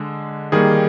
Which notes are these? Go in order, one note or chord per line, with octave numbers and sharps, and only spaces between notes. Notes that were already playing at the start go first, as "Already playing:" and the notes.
Already playing: D3 G#3
D#3 G3 A#3 G#4